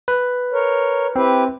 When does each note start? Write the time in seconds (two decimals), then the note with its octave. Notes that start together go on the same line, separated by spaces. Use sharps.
0.08 B4
0.52 A#4 C#5
1.16 C4 E4 G4 B4